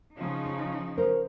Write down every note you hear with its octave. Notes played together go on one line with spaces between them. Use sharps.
C#3 F3 D#4
C#4
A#4 C5